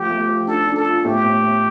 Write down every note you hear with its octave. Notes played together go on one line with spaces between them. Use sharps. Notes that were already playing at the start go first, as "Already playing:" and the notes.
Already playing: F3 A3 G4
A3
F3
D4 A4
D4
A4
F4
A2 G4
A2
A2